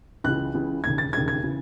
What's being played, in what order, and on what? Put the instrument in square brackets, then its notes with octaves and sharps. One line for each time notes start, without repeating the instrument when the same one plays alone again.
[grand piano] C#2 C#3 E3 F#6
C#2 C#3 E3
E1 D#2 C#3 G#6
A6
E1 D#2 C#3 G#6
G#6
C#3 E3